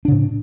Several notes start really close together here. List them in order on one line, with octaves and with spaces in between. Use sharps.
D4 C#3 A2